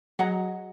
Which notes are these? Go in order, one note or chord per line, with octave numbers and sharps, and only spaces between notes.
F#3 G#4 D#5 F#5 A#5